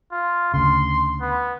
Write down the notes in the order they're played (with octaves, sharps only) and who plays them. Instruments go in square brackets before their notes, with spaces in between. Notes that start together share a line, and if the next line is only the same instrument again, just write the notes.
[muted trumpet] F4
[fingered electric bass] D2 C#3 [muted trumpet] C6
[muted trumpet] B3